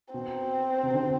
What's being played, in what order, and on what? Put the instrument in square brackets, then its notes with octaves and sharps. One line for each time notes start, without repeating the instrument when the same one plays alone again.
[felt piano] B2 [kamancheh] C4
[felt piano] C3
D3